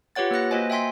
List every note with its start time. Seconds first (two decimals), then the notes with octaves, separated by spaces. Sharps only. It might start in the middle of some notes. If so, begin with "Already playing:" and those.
0.15 F4 G4 B4 C#5 F#5 A6
0.31 A#3 B4 F#6 A#6
0.51 A#3 F#4 C5 D#5 G#5
0.70 E5 G5 G#5 C6 B6